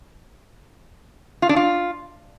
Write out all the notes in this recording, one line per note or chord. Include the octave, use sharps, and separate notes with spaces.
F4
D4
F4